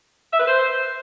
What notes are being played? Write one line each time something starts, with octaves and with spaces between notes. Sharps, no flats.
E5
B4
C5